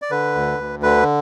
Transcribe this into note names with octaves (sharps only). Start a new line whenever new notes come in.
D5
D3 B4
D2
D2
D3 B4